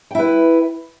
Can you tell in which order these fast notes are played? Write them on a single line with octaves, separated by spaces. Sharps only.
G5 E4 B4